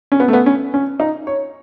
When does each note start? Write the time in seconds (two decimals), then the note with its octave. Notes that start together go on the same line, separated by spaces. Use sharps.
0.12 C#4
0.20 B3
0.28 A3
0.33 B3
0.46 C#4
0.74 C#4
1.00 D#4
1.27 C#5